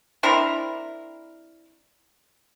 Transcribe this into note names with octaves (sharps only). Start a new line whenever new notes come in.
C4 D4 E4 A#4